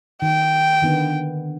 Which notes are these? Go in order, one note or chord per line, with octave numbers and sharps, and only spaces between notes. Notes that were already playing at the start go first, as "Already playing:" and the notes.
D#3 G5
D3 D#3 B3